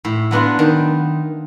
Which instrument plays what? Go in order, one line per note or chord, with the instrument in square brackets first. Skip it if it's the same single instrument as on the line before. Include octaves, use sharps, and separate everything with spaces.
[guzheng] A2
F#3 B3 D4 F4
D#3